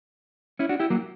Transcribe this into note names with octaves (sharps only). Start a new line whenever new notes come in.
C#4 E4
D4 F#4
E4 G4
F#3 A#3